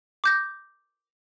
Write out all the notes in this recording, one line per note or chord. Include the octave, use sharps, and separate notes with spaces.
D6 G6 A#6